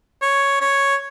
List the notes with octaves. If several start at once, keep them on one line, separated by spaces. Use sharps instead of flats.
C#5
C#5